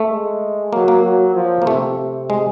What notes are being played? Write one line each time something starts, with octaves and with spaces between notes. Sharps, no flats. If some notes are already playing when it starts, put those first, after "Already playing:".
Already playing: A3
G#3
F#3 A#3
A#3
F#3
F3
A#3
C3 A3
C3
G#3